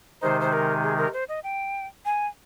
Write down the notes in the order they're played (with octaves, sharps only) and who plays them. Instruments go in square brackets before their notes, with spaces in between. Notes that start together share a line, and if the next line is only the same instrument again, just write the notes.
[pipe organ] C3 D#3 G#3 D#4 [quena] C5
[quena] C5
A#4
G#4
A#4
C5
D#5
G5
G#5